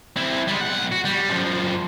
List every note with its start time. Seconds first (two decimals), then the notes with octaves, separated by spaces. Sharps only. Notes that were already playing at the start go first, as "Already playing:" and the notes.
0.16 C4 E4
0.47 G3 G#3
0.61 B1 F#5
0.92 F#4
1.05 G3
1.29 F#2 F3